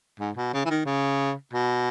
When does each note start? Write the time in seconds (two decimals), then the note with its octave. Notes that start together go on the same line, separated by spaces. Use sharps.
0.19 G#2
0.37 B2
0.54 C#3
0.65 E3
0.70 D#3
0.86 C#3
1.53 B2